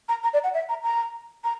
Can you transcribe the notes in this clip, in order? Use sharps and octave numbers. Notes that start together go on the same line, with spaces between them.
A#5
A#5
D5
F#5
E5
A#5
A#5
A#5